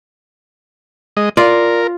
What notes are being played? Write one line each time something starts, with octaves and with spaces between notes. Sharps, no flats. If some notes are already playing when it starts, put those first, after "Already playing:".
G#3 D#5
F4 A#4 D5